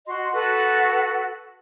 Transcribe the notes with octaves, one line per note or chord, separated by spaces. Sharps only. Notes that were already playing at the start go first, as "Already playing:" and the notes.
F#4 D#5 C6
F#4 A4 B4 F#5